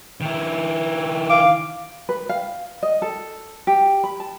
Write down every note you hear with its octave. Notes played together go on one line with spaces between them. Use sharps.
D#3 E4
F5 D6
B4
F5
D#5
A4
G4
B5
A5